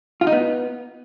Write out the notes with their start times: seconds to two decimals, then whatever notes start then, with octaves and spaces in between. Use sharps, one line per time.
0.21 F4
0.27 D#4
0.32 B3